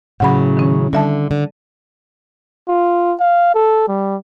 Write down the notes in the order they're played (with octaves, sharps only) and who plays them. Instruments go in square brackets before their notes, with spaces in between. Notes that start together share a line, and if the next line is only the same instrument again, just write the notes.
[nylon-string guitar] A2 C#3 F#3 [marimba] F#5 B5
[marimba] D#3 C#4
[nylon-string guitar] D3 [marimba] G3 E5 A5
[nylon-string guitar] D3
[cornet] F4
F5
A4
G3